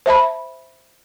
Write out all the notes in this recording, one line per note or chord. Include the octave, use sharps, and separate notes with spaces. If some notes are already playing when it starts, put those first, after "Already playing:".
C5 E5 A5 B5